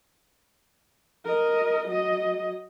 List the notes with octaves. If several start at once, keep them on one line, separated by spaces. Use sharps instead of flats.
A#4 D#5
F#3 D#5